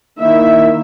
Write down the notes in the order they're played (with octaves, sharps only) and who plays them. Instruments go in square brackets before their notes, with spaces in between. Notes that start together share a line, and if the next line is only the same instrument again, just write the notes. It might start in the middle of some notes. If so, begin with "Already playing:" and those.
[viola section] D#3 A#3 E4 E5